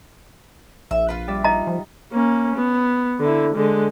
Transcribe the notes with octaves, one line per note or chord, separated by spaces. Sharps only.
A#1 E5
F4 B4
G3 D5 E5
D#4 D#5 A#5
F3
A#3 C#4
B3
D3 E4
D3 G#3